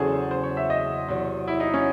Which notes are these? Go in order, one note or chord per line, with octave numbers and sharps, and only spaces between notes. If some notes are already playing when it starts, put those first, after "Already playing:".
Already playing: E2 C#3 F#3 C#4 E4 G#4 A4 C5
C5
C#5
E5
D#5
E2 C3 F#3
E4
D#4
C#4